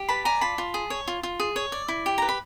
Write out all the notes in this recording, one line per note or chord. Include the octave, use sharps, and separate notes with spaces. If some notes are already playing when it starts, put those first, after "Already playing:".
Already playing: G4
B4 A5 B5
D5 G#5 A#5
F4 A5 B5
F4
G#4
C#5
F4
F4
G#4
C#5
D5
E4
G4
B4 A#5
B5